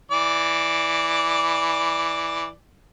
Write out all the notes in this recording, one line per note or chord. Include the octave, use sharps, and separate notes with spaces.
E3 D5